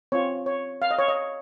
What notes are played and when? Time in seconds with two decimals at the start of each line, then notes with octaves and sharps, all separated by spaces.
0.12 C4 F4 C#5
0.46 C#5
0.82 F5
0.91 D#5
0.99 C#5
1.08 D#5